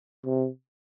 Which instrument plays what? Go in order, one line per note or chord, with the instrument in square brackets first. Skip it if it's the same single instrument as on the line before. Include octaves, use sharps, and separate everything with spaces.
[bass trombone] C3